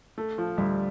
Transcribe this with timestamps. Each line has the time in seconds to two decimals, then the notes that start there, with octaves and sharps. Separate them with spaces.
0.18 A3
0.38 F3
0.57 D2 G3